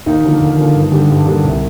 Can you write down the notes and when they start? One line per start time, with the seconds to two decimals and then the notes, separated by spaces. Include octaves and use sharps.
0.06 D#2 D#4
0.24 D3 F3 A#3
0.41 D#2
0.58 D3 F3 A#3
0.75 G2
0.92 D3 G3 A#3
1.10 G2
1.26 D3 G3 A#3
1.44 C2